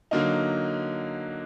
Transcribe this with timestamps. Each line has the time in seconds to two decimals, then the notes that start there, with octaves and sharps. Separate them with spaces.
0.11 D3 F#3 A#3 D#4